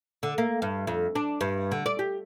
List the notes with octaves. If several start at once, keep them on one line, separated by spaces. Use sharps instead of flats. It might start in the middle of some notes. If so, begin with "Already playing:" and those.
D3
A#3
G2
F2
D4
G2
D3
D5
G4